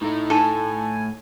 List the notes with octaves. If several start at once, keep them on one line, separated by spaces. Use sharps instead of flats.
A2 A3 D#4
D#4 A4 G#5 A5